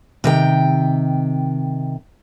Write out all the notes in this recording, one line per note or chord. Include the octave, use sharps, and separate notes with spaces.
C3 D#3 G5